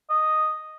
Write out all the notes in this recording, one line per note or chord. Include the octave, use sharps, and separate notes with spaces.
D#5